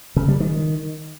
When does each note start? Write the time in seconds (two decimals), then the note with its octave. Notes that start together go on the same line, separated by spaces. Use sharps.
0.16 C#3
0.28 G3
0.40 D#3